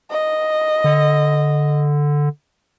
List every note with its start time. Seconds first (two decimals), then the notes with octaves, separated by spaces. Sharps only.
0.10 D#5
0.84 D3